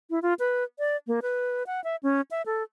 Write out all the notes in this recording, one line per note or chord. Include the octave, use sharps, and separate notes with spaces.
E4
F4
B4
D5
A#3
B4
F#5
E5
C#4
E5
A4